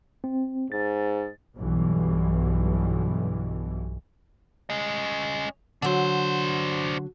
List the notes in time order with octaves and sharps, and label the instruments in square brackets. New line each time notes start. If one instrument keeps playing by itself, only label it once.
[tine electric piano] C4
[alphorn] G#2 [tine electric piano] A6
[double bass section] B1 G2 B2 E3
[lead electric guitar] C#4 D#5
[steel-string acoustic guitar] D3 F#3 [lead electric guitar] D4 C5